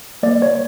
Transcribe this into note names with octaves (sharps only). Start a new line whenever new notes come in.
A#3 D5
C#5